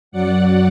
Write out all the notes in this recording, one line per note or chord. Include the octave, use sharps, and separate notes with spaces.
F#2 F#3 D5 F#5